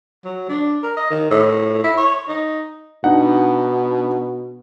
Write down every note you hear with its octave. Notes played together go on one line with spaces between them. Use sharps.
F#3
D4
A#4
D#5
D#3
A2
E4
C#5
D#4
B2 D4 D#4 F#5